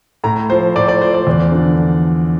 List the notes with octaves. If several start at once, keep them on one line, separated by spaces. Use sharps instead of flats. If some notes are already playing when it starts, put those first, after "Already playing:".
A2 A#5
F3 C5
A2 D5
D5
F3 C5
D5
E2
D3 F3